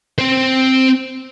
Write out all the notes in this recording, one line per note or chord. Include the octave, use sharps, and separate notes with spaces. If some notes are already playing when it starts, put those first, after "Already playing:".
C4 C5